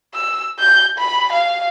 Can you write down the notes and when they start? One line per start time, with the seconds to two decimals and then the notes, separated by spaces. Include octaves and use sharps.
0.14 E6
0.59 G6
0.98 B5
1.32 F5